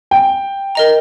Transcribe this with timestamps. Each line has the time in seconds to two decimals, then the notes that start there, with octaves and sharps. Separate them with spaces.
0.11 G5
0.75 A#4 D#5 A#5